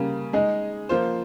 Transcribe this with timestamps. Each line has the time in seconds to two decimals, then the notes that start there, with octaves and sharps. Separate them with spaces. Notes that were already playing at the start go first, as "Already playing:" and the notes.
Already playing: C#3 G3 A#3
0.33 G#3 D#4 G#4 D#5
0.89 F3 A#3 F4 C5